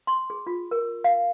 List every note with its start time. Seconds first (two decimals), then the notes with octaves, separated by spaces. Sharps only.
0.07 C6
0.30 G#4
0.47 F4
0.71 A#4
1.04 F5